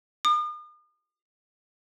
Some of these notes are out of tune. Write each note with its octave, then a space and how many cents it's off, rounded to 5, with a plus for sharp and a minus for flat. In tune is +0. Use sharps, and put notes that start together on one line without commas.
D#6 -45